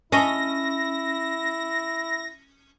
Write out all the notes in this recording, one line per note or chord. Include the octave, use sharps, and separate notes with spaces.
C#4 E4 G#4 A4 D#5 A#6